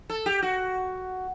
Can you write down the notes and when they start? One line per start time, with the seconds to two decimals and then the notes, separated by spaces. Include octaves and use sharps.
0.10 A4
0.26 G4
0.42 F#4